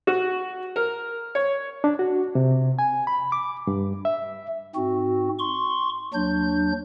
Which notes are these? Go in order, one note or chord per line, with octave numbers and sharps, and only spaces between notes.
F#4
A#4
C#5
D4
F#4
C3
G#5
B5
D6
G2
E5
G#2 C4 F#4
C6 C#6
D#2 F#3 D4 G6